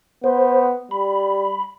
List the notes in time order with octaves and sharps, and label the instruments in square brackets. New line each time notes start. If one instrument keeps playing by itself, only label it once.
[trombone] B3 [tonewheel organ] C5
[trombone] G3 [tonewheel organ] B5